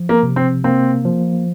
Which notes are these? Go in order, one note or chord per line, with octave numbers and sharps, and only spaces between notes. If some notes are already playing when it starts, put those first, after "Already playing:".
Already playing: F3
A#3
C3
C4
A#3 C4
F3